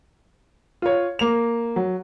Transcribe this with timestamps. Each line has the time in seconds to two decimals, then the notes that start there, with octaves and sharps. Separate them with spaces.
0.82 F4 C#5
1.19 A#3 F7
1.76 F#3